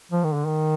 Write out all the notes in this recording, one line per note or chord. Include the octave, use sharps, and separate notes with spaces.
F3
D#3
D3
D#3